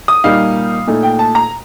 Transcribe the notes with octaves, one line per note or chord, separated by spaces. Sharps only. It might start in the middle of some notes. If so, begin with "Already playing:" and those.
D#6
A#2 G3 A#3 D#4 F5
A#2 A3 D#4
G5
A5
A#5